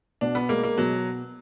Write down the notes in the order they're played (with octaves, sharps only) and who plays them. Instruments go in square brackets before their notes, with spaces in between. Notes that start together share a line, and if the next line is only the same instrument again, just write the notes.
[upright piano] B2 [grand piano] D4
[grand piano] B3
[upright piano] G#3 [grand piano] A#3
[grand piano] A#3
[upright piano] B2 [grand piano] F#3